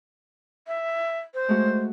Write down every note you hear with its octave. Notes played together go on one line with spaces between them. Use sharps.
E5
C5
G#3 A3 F#4